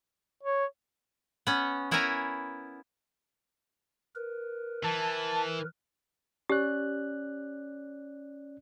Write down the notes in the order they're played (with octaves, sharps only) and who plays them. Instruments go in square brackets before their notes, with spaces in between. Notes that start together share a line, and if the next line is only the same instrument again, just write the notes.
[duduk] C#5
[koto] B3 C#4
B3 E4 A#4 C#5 G#5 A#5
[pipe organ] A#4 B4
[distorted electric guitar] E3 [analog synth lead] A5
[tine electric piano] C#4 D5 F#6 [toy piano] G4